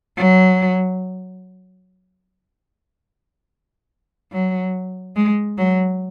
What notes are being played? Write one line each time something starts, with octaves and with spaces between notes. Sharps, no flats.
F#3
F#3
G#3
F#3